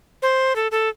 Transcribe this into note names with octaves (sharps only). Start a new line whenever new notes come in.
C5
A4
A4